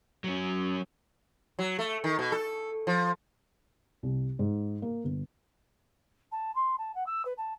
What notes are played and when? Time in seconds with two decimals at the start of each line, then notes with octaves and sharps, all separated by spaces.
0.24 F#3 C#4
1.59 F#3
1.79 A3
2.04 D#3
2.19 B2
2.32 A4
2.87 F3
4.03 C2
4.39 G#2
4.82 A#3
5.04 G1
6.31 A5
6.55 C6
6.78 A5
6.95 F#5
7.06 E6
7.25 B4
7.37 A5